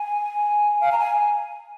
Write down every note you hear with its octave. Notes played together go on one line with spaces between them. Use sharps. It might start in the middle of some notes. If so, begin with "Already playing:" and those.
Already playing: G#5
F5
A#5
G#5